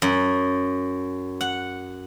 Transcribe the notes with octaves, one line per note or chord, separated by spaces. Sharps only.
F#2
F#5